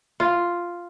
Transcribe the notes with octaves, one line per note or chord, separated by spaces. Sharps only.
F4